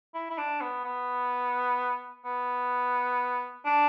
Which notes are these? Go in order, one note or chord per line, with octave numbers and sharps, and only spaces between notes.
E4
E4
D4
B3
B3
B3
D4